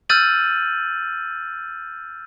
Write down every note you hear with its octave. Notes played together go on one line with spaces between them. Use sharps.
E6 F6 G6 A6 D#7 F#7